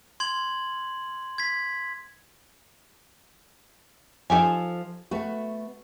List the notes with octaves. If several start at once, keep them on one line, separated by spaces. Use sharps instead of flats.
C6 G#6 F#7
G#6 B6
F3 D#4 F4 G4 A4 G#5
A3 B3 F#4